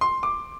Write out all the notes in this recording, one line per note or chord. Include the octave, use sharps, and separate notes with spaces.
C6
D6